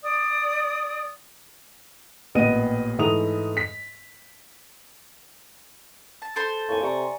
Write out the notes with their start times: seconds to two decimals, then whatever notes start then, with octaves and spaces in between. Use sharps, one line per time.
0.03 D5 D#6
2.35 A1 A#2 B3 D#5 D#7
2.99 G#2 E3 A3 A#5 D#6 F7
3.57 B6
6.22 A5
6.36 A4 C5 C6
6.69 F2 A2 A#3 G#5 C#6
6.82 C3 D5 A#5 C#6